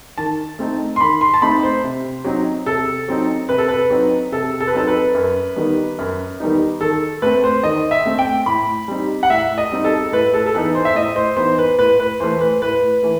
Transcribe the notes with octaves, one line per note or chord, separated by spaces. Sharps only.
D#3 A5
A3 C4 D#4
C6
D#3 B5
C6
A5
A3 C4 D#4 B5
C5
C3
F#3 C4 D#4
C3 A4
F#3 C4 D#4
C3 B4
A4
B4
F#3 C4 D#4
C3 A4
A4
B4
F#3 C4 D#4 A4
B4
F#2
D#3 G3 B3 D#4
F#2
D#3 G3 B3 D#4
D#3 A4
A3 C4 B4
C5
D#3 D#5
E5
A3 C4
G5
A2 B5
G3 C4 D#4
F#5
A2 E5
D#5
G3 C4 D#4
A4
A2 B4
A4
A4
E3 B3 D#4 B4
C5
E5
A2 D#5
C5
E3 B3 D#4 C5
B4
A2 B4
B4
E3 A3 C5
B4
A2 B4
E3 A3